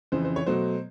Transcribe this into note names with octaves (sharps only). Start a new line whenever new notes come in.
F2 C#3 E3 C5
C5
C#5
B2 F#3 A3 C5